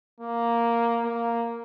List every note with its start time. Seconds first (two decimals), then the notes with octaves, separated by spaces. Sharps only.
0.21 A#3
1.04 A#3